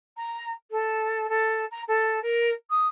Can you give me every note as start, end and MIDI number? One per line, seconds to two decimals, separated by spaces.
0.17 0.52 82
0.71 1.27 69
1.29 1.65 69
1.71 1.82 82
1.88 2.20 69
2.22 2.51 70
2.70 2.87 87